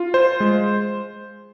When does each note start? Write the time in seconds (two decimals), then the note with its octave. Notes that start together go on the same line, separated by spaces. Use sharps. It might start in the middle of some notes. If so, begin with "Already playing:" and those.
Already playing: F4
0.14 C5
0.40 G#3